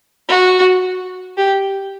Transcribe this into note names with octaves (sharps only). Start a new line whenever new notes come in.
F#4
G4